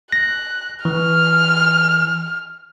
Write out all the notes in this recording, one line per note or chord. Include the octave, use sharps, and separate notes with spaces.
F#6 A#6
E3 F6